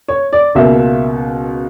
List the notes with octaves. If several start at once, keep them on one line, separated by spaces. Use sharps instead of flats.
C#5
D5
C#2 B2 A#3 E5